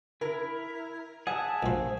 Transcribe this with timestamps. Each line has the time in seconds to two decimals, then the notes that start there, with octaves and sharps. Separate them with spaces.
0.21 E4 A#4
1.27 G#4 E5 F#5 A5
1.63 A#1 F3